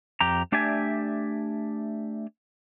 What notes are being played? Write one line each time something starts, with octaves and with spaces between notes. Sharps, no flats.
F2 G4 A#5
A3 D4 G4 D5 E5 G#5